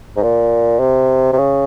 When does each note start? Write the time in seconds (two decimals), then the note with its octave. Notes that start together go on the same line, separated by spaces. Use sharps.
0.17 G#2
0.23 A#2
0.80 C3
1.33 C3
1.38 C#3